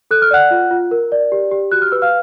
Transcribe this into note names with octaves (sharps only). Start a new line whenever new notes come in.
A4 F#6
F6
D5 F#5 F#6
F4
F4
A#4
D5
G4
G4
F#4 F#6
F6
B4 E6
F5 F6